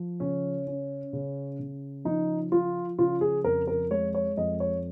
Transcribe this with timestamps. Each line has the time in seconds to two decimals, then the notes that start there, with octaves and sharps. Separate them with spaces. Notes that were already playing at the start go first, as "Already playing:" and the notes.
Already playing: F3
0.20 C#3 C#4
0.67 C#4
1.13 C#3
1.59 C#3
2.05 F3 D#4
2.51 F3 F4
2.98 C#3 F4
3.21 G#4
3.44 F2 A#4
3.68 A#4
3.90 G#3 C#5
4.14 C#5
4.37 F2 D#5
4.60 C#5